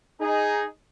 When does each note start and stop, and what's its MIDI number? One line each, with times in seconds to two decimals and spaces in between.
0.20 0.63 63
0.20 0.63 68